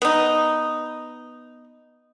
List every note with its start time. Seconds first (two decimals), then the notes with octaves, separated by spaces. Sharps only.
0.02 B3 D#4